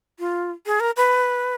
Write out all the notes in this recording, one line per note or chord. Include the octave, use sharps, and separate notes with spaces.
F4
G#4
A#4
B4